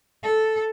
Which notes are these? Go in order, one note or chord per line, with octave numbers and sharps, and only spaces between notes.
A4